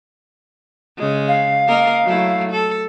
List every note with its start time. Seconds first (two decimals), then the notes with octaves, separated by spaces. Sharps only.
0.97 C#3 G#3
1.28 F5
1.67 A#3 A#4 D#5
2.04 F#3 A3 E4
2.51 A4